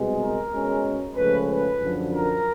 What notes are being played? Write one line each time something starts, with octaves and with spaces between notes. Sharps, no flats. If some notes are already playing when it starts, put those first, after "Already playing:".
Already playing: C2 B2 G#3 B3
A#4
B2 G#3 C#4
C#2 C#3 F3 A3 C#4 B4
B4
F#2 D3 F3
A#4